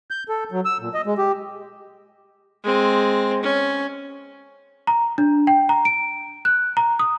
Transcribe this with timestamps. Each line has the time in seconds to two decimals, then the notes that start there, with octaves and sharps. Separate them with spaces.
0.11 G6
0.29 A4
0.52 F#3
0.65 E6
0.80 A#2
0.94 D#5
1.06 G#3
1.18 G4
2.63 G#3 C4
3.43 C#4
4.87 A#5
5.18 D4
5.47 G5
5.69 A#5
5.85 D7
6.45 F#6
6.77 A#5
6.99 D#6